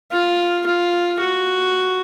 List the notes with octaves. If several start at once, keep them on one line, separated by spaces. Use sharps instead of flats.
F4
F4
F#4